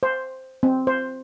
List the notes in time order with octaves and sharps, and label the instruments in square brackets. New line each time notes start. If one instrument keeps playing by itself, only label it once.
[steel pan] C5
C4
C5